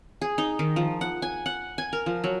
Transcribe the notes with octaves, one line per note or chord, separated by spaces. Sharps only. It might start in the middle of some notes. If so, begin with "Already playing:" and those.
G#4
D#4
D#3
F3
F#5
G#5
F#5
G#5
A#4
F3
F#3